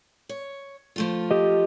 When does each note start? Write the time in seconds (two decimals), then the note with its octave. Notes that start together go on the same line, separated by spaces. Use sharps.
0.29 C#5
0.96 F3 A3 F4
1.31 G4 D#5